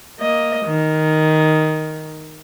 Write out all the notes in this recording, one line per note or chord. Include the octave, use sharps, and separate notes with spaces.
A#3 D#5
D#3